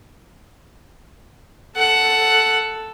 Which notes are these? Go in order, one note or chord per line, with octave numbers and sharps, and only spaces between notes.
A4 F#5